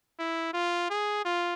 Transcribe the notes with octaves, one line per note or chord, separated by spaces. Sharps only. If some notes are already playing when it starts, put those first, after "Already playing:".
E4
F4
G#4
F4